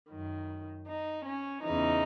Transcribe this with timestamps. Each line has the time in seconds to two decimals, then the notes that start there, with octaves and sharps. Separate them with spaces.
0.11 F#2 D#3
0.87 D#4
1.25 C#4
1.63 E2 C#3 E3 D#4